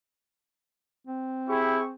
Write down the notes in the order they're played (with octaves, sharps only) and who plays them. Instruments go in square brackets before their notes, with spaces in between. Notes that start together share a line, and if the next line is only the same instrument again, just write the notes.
[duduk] C4
[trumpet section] E4 G4 C#6 [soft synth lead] G#4